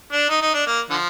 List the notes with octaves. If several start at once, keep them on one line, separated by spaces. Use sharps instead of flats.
D4
D#4
D#4
D4
A#3
D3 F3